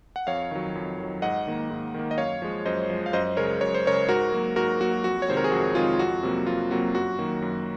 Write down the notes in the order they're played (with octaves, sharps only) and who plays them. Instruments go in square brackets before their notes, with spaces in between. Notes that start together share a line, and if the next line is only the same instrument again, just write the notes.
[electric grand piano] F#5
F2 C#5 F5
D#3 F#3
F2
D#3 F#3
G#2 D#5 F#5
D#3 A#3
G#2
D#3 A#3
D#5
F#2 C#5 F5
F3 G#3
F#2 C5 D#5
F3 G#3
F5
F#2 C5 D#5
C#3 G#3 A#4 C#5
F#2 C#5
C5
C#3 G#3 A#4 C#5
G#2 F#4 A#4
F#3 A#3
G#2 F#4 A#4
F#3 A#3 F#4
F2 F#4
C#5
C3 D#3 G#3 C5
A#4
G#4
F2 F#4
C3 D#3 G#3 F4 G#4
F2 F#4
C3 F#3 A#3
F2 F4
C3 F#3 A#3 F#4
F#2 F#4
D#3 F#3 A#3
F#2